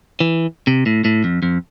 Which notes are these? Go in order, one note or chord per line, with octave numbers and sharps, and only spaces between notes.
E3
C3
A2
A2
F2
F2